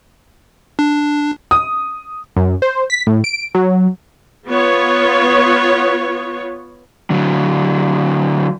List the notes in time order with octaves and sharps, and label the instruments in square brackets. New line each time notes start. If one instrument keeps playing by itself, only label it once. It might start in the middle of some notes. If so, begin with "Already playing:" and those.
[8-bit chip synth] D4
[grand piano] D#6
[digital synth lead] F#2
C5
B6
A2
D7
F#3
[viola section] B3 F4 C#5
[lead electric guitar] D3 F#3